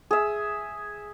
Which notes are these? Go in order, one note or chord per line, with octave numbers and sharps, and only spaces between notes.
G#4 E5